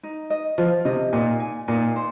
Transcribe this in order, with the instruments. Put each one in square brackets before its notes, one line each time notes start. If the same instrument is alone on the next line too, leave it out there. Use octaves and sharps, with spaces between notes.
[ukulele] D#4
D#5
[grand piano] F3 [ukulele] F4
[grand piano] C3 [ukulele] D#5
[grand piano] A#2 [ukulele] D#4
[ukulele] G#5
[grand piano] A#2 [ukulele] D#4
[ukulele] C5